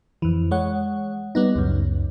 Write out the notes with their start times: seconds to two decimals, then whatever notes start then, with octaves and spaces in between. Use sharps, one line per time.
0.22 F2 E3
0.51 G#3 C#5 F#5
1.35 G3 B3 D#4
1.56 C#2 F#2